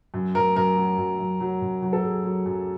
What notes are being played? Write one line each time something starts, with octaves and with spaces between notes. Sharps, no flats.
F#2
F#2 A#4
F#2 A#4
F#3
F#2
F#2
F#3
F#2
F#3
A4
F#2 G#4
F#3
F#2